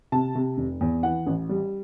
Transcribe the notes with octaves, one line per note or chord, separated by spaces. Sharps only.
C3 A5
C3
F1
E2
E3 F#5
A1
G3